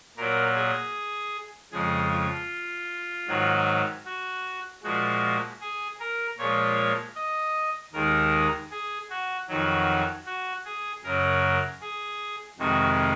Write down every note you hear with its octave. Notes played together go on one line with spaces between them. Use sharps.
A#2 F#3 A#4
G#4
F2 C#3 F3 G#3 G#4
F4
G#2 D#3 F#3
F#4
A#2 F3 G#3 F#4
G#4
A#4
A#2 F3 G#3 C#5
D#5
D#2 D#3 G#3 A#4
G#4
F#4
F2 D#3 F#3 F#4
F#4
G#4
F#2 C#3 F#3 A#4
G#4
F2 C3 D#3 G#3 F#4